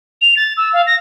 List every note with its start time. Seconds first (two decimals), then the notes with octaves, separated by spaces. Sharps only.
0.21 F7
0.36 A6
0.57 E6
0.73 F5
0.87 A#6